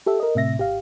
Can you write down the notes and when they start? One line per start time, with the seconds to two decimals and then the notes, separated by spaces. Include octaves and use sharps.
0.06 G4 A4 E5
0.20 A#4 D#5
0.35 A2 C3 E5 A#6
0.58 G#1 G4 F5